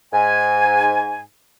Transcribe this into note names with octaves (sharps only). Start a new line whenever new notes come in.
G#2 G#5